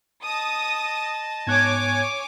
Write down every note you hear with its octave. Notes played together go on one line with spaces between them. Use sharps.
D#5 A5 D#6
G#2 B3 C#5 G#5 D6 F#6 G#6